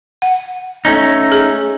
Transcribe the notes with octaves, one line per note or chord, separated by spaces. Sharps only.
F#5
A3 C#4 D#4
G#4